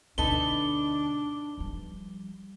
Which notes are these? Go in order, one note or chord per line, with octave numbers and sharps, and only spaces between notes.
D2 B2 D4 D#4 A4 B4 G7
F3 G3